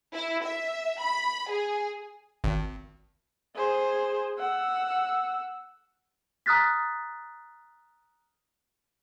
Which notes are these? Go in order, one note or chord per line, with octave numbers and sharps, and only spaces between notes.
E4
E5
B5
G#4
G#1
G#4 C5
F#5 E6
A#5 D#6 F6 F#6 A6 B6